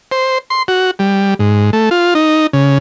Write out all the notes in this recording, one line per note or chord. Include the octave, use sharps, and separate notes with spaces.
C5
C6
F#4
G3
G#2
A3
F4
D#4
C#3